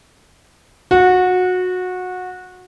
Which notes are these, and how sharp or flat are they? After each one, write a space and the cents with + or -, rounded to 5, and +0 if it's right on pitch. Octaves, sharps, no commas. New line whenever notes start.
F#4 -20